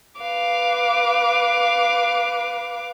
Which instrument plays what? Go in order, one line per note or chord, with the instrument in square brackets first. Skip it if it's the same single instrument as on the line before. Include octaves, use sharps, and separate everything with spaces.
[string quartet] B4 F5 D6